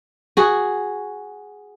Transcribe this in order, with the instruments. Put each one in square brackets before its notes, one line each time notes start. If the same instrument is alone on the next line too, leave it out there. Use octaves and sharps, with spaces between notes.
[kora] F#4 G#4